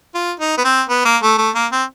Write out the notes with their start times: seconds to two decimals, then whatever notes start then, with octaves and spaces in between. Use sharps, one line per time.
0.15 F4
0.40 D#4
0.58 B3
0.65 C4
0.89 B3
1.05 A#3
1.23 A3
1.38 A3
1.55 A#3
1.72 C4